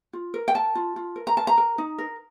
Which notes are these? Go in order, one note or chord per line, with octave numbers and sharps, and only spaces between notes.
F4
A#4
G5
A#4 A5
F4
F4
A#4
A#5
A#4 A5
A#5
A#4
D#4
A#4